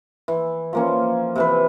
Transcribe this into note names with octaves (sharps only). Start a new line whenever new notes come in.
E3
F3 A#3 C#4
C3 E3 B4